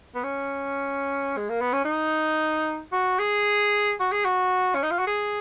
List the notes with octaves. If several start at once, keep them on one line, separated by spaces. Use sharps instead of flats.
B3
C#4
G#3
A#3
B3
C#4
D#4
F#4
G#4
F#4
G#4
F#4
C#4
D#4
F4
F#4
G#4